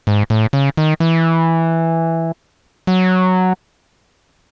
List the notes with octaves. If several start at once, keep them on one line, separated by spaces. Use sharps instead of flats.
G#2
A2
C#3
D#3
E3
F#3